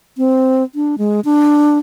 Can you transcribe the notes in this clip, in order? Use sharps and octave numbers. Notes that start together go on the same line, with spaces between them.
C4
D4
G#3
D4